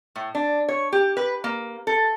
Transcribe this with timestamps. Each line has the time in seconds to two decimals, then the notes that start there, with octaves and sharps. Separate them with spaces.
0.16 A2
0.35 D4
0.69 C#5
0.92 G4
1.17 B4
1.44 A#3
1.87 A4